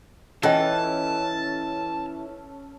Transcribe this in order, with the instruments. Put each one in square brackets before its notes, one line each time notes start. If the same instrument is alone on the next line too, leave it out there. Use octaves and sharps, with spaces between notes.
[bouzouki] E3 [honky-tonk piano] C#4 A4 [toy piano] F4 D#5 G5 [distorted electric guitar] A5